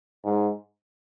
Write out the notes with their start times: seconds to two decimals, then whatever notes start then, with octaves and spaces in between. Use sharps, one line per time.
0.24 G#2